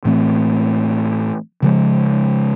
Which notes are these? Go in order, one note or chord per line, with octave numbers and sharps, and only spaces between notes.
A2 E3 A3 C4
C#3 F3 G#3